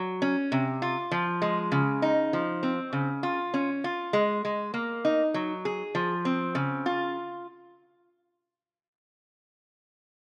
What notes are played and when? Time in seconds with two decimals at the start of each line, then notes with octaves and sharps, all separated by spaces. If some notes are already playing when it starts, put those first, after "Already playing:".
Already playing: F#3
0.22 C#4
0.52 C3
0.82 F4
1.11 F3
1.42 G#3
1.72 C#3
2.02 D#4
2.33 F3
2.63 C4
2.93 C#3
3.23 F4
3.54 C#4
3.84 F4
4.13 G#3
4.45 G#3
4.74 A#3
5.05 D#4
5.34 F#3
5.65 G#4
5.95 F3
6.25 C4
6.55 C#3
6.86 F4